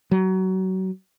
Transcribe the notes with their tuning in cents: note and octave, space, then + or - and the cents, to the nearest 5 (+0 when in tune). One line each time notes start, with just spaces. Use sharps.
F#3 +25